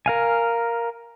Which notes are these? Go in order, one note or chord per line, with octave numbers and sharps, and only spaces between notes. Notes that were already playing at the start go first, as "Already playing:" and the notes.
A#4 F5 G#5